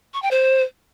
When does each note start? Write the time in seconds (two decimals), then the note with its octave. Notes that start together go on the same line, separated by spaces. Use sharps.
0.14 C#6
0.22 G5
0.31 C5